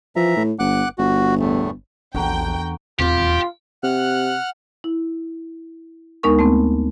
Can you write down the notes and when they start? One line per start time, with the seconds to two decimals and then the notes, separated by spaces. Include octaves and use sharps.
0.16 E3 F3 E5 A#5
0.36 A2
0.59 G1 F#5 D6 F#6
0.98 G1 F#4
1.39 E2 A2 A3
2.15 A#1 E2 D3 F#4 G5 A#5
2.99 D#1 E2 C4 F4 G4
3.83 C3 F#5 F6 F#6
4.84 E4
6.23 D2 G#3 B3 D#4 A#4 C#6
6.39 A3 B3 C4